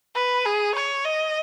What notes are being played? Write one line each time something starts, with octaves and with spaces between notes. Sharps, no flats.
B4
G#4
C#5
D#5